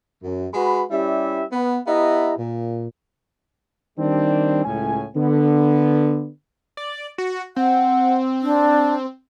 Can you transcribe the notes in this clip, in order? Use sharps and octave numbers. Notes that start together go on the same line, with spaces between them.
F#2
G#3 F#4 B4 B5
G3 C#4 E4 G4 D5 E5
B3
B3 E4 G4 D#5 E5 A#5
A#2
D#3 G3 C4 D4
C#2 A2 C#4 G#5
D3 B3
D5
F#4
C4 F#5
D4